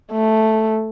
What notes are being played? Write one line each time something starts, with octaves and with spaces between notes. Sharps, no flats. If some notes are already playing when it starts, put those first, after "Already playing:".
A3